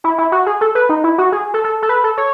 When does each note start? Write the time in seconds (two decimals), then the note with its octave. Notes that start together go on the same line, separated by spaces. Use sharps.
0.04 E4
0.18 E4
0.32 F#4
0.46 G#4
0.61 A4
0.75 B4
0.89 D#4
1.04 E4
1.18 F#4
1.32 G#4
1.54 A4
1.64 A4
1.82 A4
1.89 B4
2.04 A4
2.18 C#5